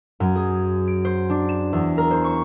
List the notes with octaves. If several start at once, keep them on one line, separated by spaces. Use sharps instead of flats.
F#2
G#4
D7
C5
D4
E7
E2
A#4
C5
C#6